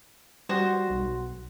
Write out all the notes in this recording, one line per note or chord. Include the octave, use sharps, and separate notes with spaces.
G3 F#4 C5
B1